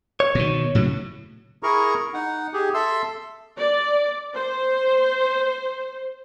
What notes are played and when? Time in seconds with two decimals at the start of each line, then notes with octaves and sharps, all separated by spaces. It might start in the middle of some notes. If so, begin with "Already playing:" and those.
0.20 C#5
0.35 B2 D#3
0.75 A2 C#3 F#3
1.63 E4 G#4 A#4 A#5 C#6
2.14 D#4 F#5
2.53 G4 G#4
2.74 A4 E5 C6 E6
3.57 D5
4.35 C5